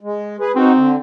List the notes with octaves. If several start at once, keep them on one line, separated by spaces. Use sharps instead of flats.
G#3
G#4 B4
C4 D#4 F#4
D3